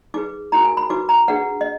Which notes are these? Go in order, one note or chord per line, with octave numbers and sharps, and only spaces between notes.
D#4 G#4 B4 D6
D#4 F#4 A#4 A#5
G#5
B5
D#4 F#4 B4 D6
A#5
D4 G#4 B4 F#5
D#5